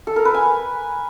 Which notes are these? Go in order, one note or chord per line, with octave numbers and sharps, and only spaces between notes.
A4
A#4
B4
G#5